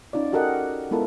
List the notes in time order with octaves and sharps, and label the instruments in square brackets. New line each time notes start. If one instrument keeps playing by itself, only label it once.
[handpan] C#4 D#4 F4 D5
F#4 G4 A4 A#4 D#5 F#5
G#3 B3 E4 F4 A4 A#4